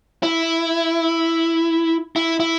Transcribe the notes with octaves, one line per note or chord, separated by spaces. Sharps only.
E4
E4
E4